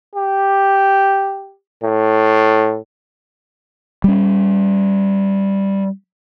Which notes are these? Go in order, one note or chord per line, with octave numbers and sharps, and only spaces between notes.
G4
A2
G3 C#4